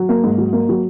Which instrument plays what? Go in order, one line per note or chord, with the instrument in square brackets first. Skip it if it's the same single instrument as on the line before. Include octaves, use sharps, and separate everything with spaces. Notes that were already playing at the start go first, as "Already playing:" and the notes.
Already playing: [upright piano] F#3
A#3
G#2
F#3
A#3
F#3